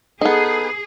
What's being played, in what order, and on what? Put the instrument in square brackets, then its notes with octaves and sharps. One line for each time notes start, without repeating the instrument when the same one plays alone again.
[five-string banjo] B3 D#4 [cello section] G#4 [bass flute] A4